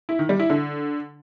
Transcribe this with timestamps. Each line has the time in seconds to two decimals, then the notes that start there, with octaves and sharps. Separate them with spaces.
0.09 E4
0.19 D#3
0.29 G3
0.39 E4
0.50 D3